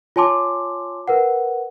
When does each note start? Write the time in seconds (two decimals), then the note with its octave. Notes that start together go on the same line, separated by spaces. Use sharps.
0.16 F4 C#5 G#5 A5 C6 D6
1.08 A#4 B4 F#5